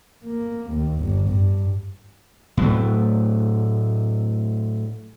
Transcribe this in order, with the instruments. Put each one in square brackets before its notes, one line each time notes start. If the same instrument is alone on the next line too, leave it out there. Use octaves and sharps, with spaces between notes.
[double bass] A#3
D#2
G1
G2
[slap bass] A2 F#3 A3